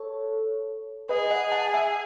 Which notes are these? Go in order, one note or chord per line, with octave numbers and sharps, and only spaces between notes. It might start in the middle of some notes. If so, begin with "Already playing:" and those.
Already playing: A4 C#5
G#4 B4 D#5
D#5 F#5
F#5 A5
E5 G#5